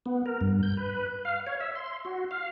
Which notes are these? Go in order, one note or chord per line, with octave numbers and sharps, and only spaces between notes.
B3
A#4
G2
G6
B4
F5
C#5
E5
C6
F#4
F5